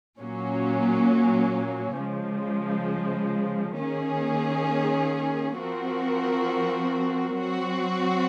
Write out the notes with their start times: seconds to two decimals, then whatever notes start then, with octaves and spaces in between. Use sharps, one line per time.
0.20 A#2 F#3 A#3 C#4
1.99 C#3 F3 G#3
3.79 D#3 A#3 C#4 G#4
5.59 F3 C4 F#4 A#4
7.38 F#3 C4 F#4